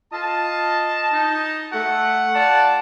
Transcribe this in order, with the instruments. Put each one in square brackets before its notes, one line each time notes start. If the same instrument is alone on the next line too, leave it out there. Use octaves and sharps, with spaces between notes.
[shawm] F4 [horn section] D#5 A5
[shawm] D#4
[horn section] A3 [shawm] F#5
[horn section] F4 D5 A5